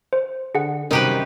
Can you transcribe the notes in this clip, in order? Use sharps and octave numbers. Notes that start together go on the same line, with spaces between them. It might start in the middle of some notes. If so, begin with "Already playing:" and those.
C5
D3 G#4 F#5
F#2 C3 D#3 G3 D#4 G4 B4